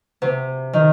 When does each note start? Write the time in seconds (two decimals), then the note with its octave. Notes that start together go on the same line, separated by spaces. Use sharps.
0.22 C3
0.73 D#3